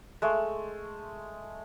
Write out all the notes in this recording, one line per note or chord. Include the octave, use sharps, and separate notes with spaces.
G#3 A3